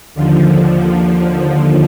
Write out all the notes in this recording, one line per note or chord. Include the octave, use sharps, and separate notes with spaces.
D#2 D3 F3